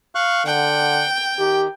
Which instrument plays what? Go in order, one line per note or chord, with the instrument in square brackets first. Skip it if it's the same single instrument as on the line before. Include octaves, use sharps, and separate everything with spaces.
[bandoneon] F5 C#6 F#6
[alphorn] D3 [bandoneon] F#5 [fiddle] G5
[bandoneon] D#3 [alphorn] G4